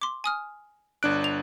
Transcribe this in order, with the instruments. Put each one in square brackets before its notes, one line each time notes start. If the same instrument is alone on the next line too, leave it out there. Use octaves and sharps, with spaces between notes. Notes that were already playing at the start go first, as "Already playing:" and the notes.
[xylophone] C6 D6
G#5 D#6 F6
[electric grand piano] G1 D4 F#6 [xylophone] D7
[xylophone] F7